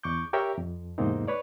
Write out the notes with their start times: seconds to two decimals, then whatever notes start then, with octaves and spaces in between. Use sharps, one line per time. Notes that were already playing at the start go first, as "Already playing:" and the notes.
0.03 E2 C#6 D6 G6
0.33 G4 A#4 C#5 E5 G5
0.58 F2
0.98 E2 G#2 C3 A#3 C4 D#4
1.28 B4 C#5 D5